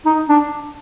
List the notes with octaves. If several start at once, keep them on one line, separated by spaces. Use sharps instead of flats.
D#4
D4